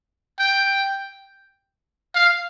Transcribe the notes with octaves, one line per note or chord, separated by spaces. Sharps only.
G5
F5